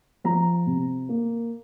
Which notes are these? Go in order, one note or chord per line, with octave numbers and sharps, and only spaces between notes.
F3 A#5
C3
A#3